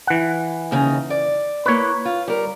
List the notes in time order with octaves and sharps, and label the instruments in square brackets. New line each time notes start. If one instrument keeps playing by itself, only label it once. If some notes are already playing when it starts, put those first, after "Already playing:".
[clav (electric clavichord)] E3 F#5
[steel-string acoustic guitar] D#2 C#3 D#4
D5
[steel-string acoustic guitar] A#3 E4 [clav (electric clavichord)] B4 C#5
[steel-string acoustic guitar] F4
G3 A#4